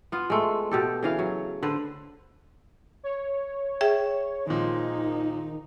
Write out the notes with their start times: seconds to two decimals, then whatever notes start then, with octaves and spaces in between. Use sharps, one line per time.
0.12 B3 F4
0.30 G#3 A3
0.71 B2 G4 A4
1.03 C#3 E3 F5
1.19 F#3
1.63 D3 B4 C5
3.03 C#5
3.81 G#4 E5 G5
4.47 A#2 D#3 F3 G#3 D#4